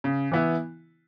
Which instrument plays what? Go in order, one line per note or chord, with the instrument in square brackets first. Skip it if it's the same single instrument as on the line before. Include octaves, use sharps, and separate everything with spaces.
[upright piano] C#3
E3 B3 E4